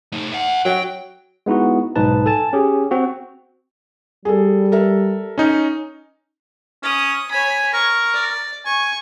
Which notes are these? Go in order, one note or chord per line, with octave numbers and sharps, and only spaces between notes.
A3 D#4
E5 F#5
F#3 G5
G#3 B3 D#4 E4 F#4
B1 G#2 D#4 B4 A5
A4 G#5 A5
C#4 G4 G#4
C4 F#4
G3 G#4 A4
A4 A#4 E5
C#4 D#4
C#4 D#6
C#5 G#5 B5
A#4 C#6
D5
G#5 C#6